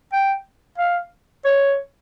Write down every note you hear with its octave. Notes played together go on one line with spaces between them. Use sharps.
G5
F5
C#5